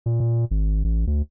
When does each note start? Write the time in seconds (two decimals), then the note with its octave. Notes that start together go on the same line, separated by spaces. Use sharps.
0.06 A#2
0.20 A#2
0.51 G#1
0.84 A1
1.07 D2